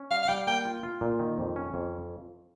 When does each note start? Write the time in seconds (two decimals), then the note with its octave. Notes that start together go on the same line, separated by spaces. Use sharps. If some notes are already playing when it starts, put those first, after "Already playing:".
Already playing: C#4
0.11 G3 F5
0.23 F5
0.29 G3 G5
0.47 A#3 G5
0.65 F4
0.83 F4
1.01 A#2
1.19 D#3
1.38 F2
1.56 C#4
1.74 F2